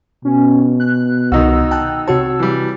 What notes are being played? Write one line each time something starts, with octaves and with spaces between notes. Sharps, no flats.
B2 C#4
F#6
C2 D#3 D#4 F#4 E6
G5 A5 F#6
C3 F#4 C#5 A5
E3 G3